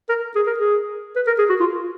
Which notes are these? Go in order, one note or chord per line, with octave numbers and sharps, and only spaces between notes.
A#4
G#4
A#4
G#4
B4
A#4
G#4
F#4
F4